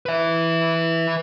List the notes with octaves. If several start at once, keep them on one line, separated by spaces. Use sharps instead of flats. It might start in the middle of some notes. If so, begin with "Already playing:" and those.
B4 E5